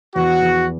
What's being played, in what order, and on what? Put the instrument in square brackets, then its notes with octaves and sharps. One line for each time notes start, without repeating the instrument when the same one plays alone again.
[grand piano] E2 [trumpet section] F#4
[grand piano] E2